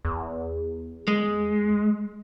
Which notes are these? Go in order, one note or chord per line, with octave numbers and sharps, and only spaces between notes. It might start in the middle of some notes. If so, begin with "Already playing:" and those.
E2
G#3